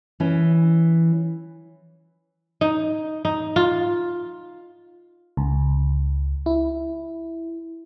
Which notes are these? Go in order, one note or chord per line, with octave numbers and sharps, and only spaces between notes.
E3 C#4
D#4
D#4
F4
C#2
E4